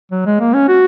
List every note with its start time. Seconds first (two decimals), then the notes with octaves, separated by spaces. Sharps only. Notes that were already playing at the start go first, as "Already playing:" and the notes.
0.11 F#3
0.26 G#3
0.40 A#3
0.53 C#4
0.68 F#4